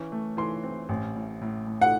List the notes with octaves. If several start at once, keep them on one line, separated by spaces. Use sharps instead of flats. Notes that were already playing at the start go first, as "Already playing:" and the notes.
Already playing: E3 C#4
A3
E3 C6
C4
A1
A2
A2
A2
F#5